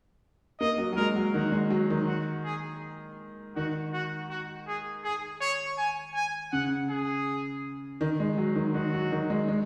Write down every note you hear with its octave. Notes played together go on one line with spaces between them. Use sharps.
A#3 D#5
F#3
F#3
G#3 A#4
F#3
D#3 F#4
G#3
F#3
D#3
F#4
G#4
D#3 F#4
F#4
F#4
G#4
G#4
C#5
G#5
G#5
C#3 F#5
G#4
D#3
G#3
F#3
D#3
D#3 F#4
F#3
D#3
G#3
G#3